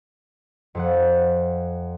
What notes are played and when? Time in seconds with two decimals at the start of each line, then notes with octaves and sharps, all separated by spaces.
0.75 F2 F3 F#5